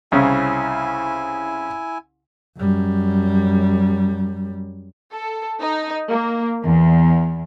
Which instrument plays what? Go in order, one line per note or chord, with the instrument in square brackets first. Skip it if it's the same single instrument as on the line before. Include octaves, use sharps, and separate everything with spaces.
[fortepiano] C2 C#3 C#4 [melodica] E4 G#5
[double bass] F#2 G3
[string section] A4
D#4
A#3
E2